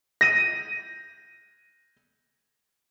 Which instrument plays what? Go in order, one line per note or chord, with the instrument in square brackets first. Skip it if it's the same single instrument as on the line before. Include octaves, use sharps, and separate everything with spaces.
[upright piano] A#6 D#7